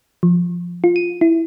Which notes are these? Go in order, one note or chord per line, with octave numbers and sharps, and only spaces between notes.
F3
F4
D#7
E4